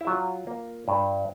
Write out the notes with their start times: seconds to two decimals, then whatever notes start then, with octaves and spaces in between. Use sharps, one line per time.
0.01 E4
0.07 F#3 F4
0.47 A#3
0.88 G2